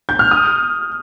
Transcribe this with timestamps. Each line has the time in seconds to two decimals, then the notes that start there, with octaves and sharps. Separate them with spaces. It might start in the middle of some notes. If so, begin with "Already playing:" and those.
0.09 G6
0.19 F6
0.31 D#6